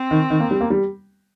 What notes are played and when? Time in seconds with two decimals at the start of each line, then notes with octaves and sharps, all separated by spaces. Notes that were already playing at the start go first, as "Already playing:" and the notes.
Already playing: C4
0.11 D#3
0.30 D#3
0.40 A#3
0.51 G3
0.61 A#3
0.70 G3